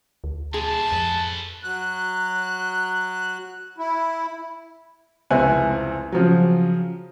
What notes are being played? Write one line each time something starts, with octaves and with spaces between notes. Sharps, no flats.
D2
B2 G#3 G#4 A5
F2 A4 B4
F#3 F#6
E4
F1 C#2 C4 E4 G#5 F#6
C#3 F3 F#3